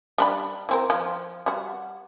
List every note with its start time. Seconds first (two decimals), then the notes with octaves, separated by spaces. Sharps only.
0.18 G3 D4 B5
0.69 E3 C4 A#4
0.90 F3
1.46 G3 F#4